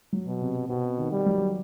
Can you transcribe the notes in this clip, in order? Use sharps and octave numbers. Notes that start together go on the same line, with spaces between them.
F#3
B2
C3
B2 C4
D#3
G3
F#3